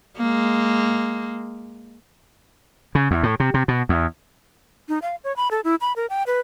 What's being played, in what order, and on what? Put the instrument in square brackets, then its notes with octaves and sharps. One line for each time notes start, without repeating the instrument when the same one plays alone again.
[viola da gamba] G#3 A#3
[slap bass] C#3
E2
A2
C3
C3
B2
E2
[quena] D#4
F5
C#5
B5
A4
E4
B5
A#4
G5
B4